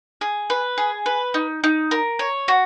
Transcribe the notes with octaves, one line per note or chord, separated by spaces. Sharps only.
G#4
B4
G#4
B4
D#4
D#4
A#4
C#5
F#4